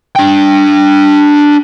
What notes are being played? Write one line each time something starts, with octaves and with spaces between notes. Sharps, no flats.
D4 G5